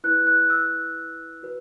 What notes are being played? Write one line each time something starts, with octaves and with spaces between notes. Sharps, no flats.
E4 B4 F#6
F#6
E6
F#4 B4